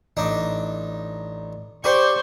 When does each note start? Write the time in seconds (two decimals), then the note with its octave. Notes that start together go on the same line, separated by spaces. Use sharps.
0.17 A1 D4 D#4
1.84 G4 C5 D5 C#6